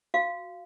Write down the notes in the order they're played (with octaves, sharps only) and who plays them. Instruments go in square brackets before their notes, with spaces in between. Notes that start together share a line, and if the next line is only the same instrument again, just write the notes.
[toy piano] F#4 F5